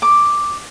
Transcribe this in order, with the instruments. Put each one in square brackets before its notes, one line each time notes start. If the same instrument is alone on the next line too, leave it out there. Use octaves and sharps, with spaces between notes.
[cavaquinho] D6